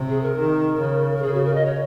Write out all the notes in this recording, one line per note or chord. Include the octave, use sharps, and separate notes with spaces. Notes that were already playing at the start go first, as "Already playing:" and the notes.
Already playing: C3
G#4
A#4
D#3
C#3
A#4
C#3 G#4
F#4
A#4
D#5
C#5